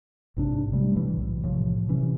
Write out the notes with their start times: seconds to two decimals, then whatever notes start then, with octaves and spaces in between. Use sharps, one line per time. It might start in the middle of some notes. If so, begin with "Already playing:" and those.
0.37 A1 G#2 C3 D4
0.72 C3 G3 A3
0.96 A2 E3
1.17 B1
1.43 A2 C3 F3
1.88 C3 E3 C#4